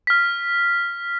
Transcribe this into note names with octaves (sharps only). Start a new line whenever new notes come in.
F6 B6